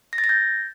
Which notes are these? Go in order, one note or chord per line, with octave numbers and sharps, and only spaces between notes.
A#6
A6
A#6
G6